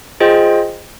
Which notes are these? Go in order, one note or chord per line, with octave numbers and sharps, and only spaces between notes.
F4 G#4 C5 D#5 G5